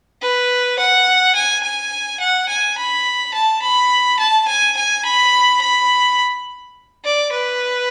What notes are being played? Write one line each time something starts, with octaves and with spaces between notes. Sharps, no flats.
B4
F#5
G#5
G#5
F#5
G#5
B5
A5
B5
A5
G#5
G#5
B5
B5
D5
B4